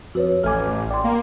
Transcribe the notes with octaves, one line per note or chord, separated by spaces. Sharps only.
F2 F#4 B4 C#5
A1 A3 G#5 D6 F6
D5 G5 C6
A#3